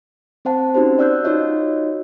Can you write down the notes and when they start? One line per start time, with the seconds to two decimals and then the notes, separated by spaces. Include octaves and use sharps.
0.45 C4 C5 F#5 A5
0.74 C#4 D#4 F#4 G4 C5
0.99 D5 F#5 E6 F#6 G6
1.24 D#4 F4 F#4 C#5 D#5